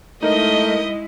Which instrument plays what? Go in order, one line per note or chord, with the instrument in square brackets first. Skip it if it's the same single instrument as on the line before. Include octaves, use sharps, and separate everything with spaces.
[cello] G#3 E4 [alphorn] A3 [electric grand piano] D#4 A#4 [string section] D#5